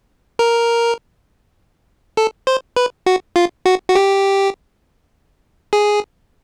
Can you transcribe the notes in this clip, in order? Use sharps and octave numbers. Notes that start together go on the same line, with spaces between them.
A#4
A4
C5
B4
F#4
F4
F#4
F#4
G4
G#4